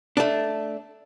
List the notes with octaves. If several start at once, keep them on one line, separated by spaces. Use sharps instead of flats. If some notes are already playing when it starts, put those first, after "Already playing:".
A3 D4